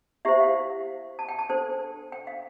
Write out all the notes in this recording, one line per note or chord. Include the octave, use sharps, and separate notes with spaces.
E4 G4 C5 E5
F5
A5
G5
A5
D4 A4 C5
G5
F5